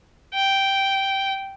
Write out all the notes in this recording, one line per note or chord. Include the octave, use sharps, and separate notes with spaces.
G5